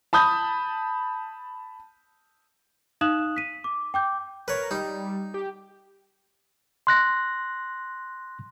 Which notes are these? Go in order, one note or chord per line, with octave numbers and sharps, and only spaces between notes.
A5 B5 D#6 G6
D#4 F5 D#6 F#6 E7 F#7
B6 D#7
D6
G5 D6 G6
A#4 B4 C#5
G3 D#4
G4
C6 F#6 A#6